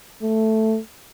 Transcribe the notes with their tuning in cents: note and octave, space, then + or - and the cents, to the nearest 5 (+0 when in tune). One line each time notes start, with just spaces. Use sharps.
A3 +5